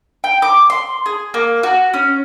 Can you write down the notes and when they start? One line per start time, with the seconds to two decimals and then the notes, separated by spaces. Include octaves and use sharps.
0.24 G5
0.42 D6
0.70 C6
1.06 G#4
1.34 A#3
1.63 F#4
1.94 C#4